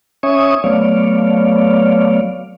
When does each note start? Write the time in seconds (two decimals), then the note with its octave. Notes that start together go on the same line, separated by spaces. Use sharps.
0.23 C#4 C#5 E5 G#5 C#6 D#6
0.64 F#3 A3 B3 C#5 D5 F5